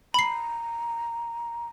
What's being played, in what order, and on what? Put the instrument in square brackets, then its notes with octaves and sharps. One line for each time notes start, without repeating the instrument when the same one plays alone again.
[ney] A#5 [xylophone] B5 C7